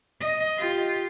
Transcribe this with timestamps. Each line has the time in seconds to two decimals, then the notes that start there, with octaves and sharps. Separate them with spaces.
0.21 D#5
0.58 F4 G4